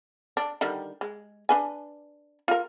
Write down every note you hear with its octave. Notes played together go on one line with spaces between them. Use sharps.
D4
D3 D#3 G3
G#3
D4 B4 G#5
F4 A#4